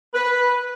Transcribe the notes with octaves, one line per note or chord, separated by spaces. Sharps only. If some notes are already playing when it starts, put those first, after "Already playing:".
B4